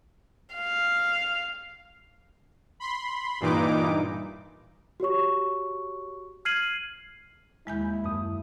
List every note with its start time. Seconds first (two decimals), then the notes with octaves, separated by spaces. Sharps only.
0.55 F5
2.80 B5 C6
3.40 G2 A#2 E3 D#4 D6
5.00 F#4 G4 C#5 C#6
6.45 F6 G#6 C7 D#7 F#7
7.67 D#2 G#3 E4 G#5 G6
8.04 F#2 A5 D#6